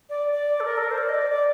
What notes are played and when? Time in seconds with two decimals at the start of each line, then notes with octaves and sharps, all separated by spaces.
0.10 D5
0.32 D5
0.60 A4
0.65 A#4
0.77 A4
0.84 A#4
0.91 C5
0.98 D5
1.09 D#5
1.14 D5
1.31 D5